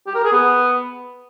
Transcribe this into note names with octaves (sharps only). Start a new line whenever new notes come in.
G4
A#4
G#4
B3